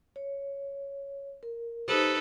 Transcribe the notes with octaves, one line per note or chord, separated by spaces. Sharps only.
C#5
A#4
D#4 G4 A4 B4 C5